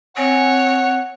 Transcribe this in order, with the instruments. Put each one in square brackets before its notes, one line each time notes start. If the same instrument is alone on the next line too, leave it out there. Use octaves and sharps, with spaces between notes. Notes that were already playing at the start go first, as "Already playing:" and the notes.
[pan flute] C4 [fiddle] C#5 [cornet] F#5 [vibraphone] G#5